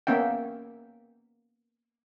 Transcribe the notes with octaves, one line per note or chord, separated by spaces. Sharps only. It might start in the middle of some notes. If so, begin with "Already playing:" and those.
A#3 B3 C#4 E5 G5